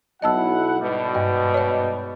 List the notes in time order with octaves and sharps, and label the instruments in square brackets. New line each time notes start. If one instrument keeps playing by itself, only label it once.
[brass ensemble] B1 E4 F#5 [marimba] D#5 A5 E6
[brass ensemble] G#2 B2 G3
[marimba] G2 D#5
C#5 D#5